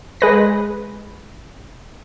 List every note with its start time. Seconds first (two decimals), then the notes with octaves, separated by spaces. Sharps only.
0.21 G#3 B4 A#6